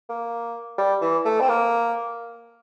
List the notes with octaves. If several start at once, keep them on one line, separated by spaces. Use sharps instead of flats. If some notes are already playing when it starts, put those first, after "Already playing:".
A#3
G3
E3
A3
C4
A#3